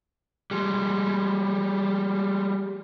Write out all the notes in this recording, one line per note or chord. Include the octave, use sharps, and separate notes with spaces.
G3 G#3